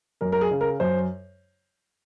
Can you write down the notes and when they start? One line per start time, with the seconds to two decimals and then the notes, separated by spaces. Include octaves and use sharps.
0.21 F#2 A#4
0.32 A#4
0.41 G#4
0.51 C#3
0.61 A#4
0.80 F#2 C5